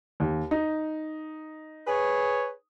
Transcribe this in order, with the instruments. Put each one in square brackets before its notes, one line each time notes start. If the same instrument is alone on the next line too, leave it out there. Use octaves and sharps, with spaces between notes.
[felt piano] D#2
D#4
[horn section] G#4 B4 C#5